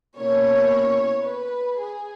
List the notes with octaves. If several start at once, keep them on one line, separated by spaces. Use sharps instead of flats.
B2 A#3 C#4 E4 C#5
B4
G#4